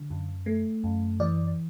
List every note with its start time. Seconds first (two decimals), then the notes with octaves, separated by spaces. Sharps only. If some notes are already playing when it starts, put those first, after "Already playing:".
Already playing: D3
0.10 F#2
0.46 A3
0.84 F#2
1.20 E3 D5